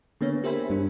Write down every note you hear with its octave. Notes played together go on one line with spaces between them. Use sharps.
D3 A#3 B3 C#5
G4 A#4 C5 E5 G#5 B5
G2 G3 D4